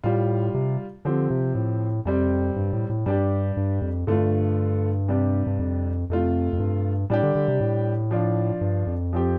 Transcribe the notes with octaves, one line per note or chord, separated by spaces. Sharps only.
A2 G3 F4
C3
D3 F3 C4 G4
C3
A2
F2 C3 G3 C4
G2
A2
A2
G2 G3 D4 G4
G2
F2
G2 D3 A3 F4
C3 G3 D4 G4
G2
F2
F2 C3 A3 F4
F2
G2
A2 G3 D4 G4
D3
D3
C3
A2
F3 D4 F4
G2
F2
F3 C4 G4